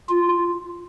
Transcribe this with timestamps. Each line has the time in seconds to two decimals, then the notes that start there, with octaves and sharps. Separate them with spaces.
0.09 F4